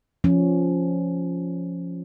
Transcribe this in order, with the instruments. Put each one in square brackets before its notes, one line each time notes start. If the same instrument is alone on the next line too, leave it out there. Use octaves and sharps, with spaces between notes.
[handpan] F3 C#4